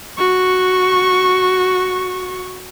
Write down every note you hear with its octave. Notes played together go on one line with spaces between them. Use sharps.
F#4 C#6